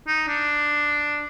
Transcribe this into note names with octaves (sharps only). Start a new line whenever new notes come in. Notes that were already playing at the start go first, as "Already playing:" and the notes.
D#4
D4